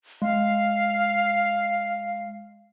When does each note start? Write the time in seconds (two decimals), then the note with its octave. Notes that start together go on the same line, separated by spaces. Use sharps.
0.22 G#3 F5